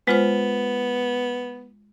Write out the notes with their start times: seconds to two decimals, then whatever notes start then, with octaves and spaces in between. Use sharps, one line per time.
0.08 G#3 B3 F4 C5